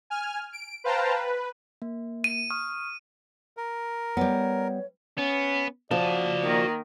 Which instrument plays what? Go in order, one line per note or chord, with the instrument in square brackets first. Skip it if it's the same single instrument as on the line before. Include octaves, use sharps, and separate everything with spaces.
[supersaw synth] G#5 F6
D7
B4 C5 F5 G5 A5 A#5
B4
[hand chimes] A#3
[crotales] D#7
[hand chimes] C#6 D#6 F6
[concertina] A#4
[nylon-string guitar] G3 B3 [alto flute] C#5
[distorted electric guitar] B3 [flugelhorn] C#4
[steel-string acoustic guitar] F3 [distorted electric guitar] F#4 A5 [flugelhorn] D5
[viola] D#3 A#3